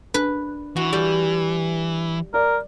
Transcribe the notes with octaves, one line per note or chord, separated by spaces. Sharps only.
D4 B4
E3 F#4
G3
A#4 D5